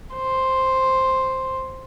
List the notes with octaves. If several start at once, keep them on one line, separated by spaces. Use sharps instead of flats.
C5